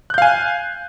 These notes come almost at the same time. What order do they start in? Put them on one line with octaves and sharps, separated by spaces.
F#6 G6 F5 G#5